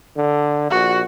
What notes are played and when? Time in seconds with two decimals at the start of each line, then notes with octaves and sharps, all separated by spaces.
0.17 D3
0.71 A#1 F#4